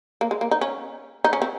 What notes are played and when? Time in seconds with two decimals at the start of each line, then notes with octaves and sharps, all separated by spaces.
0.21 A#3
0.31 G#3
0.41 A#3
0.51 D#4
0.61 C#4
1.24 D#4
1.33 C#4
1.42 C4